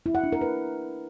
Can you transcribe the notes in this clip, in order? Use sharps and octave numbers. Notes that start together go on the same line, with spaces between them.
E4
F#5
D4
A#4
B4